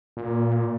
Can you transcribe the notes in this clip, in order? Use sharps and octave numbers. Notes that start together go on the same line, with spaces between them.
A#2